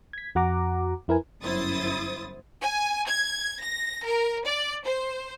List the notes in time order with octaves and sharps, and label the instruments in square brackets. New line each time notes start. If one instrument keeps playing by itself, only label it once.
[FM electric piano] G#6 B6
F2 F#4 F#5 A#5 D6
F2 E4 A#4 B4 G#5
[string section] G1 F#2 E4 C5 D#6 A6
[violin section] G#5
G#6
A#6
A#4
D5
C5